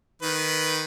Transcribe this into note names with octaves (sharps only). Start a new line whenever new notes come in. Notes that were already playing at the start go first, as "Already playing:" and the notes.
D#3 B4